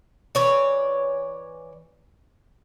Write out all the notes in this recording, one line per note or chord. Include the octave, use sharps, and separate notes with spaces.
E3 C#5 D5